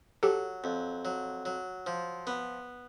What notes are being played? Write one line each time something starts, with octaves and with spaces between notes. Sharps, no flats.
F#3 G4 A4
F2
F#3
F#3
F3
B3